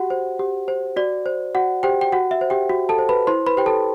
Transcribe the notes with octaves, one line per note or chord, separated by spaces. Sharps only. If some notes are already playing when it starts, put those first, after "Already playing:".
Already playing: F#4 G4 F#5
C5
G4
C5
F#4 D5
C5
F#4 F#5
G4 C5 G5
G5
F#4 F#5
E5
C5
G4 G5
F#4
A4 A5
C5
B4 B5
E4 C5 C6
B4 B5
G4 C5 G5
A4 A5